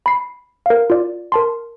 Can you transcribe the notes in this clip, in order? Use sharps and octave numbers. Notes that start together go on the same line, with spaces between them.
B5 C7
A#4 F5
F4 D5
A#4 A5 C6